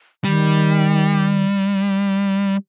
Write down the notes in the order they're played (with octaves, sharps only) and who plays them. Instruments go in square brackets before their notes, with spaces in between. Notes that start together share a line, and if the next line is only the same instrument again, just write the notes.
[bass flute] D#3 [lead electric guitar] G3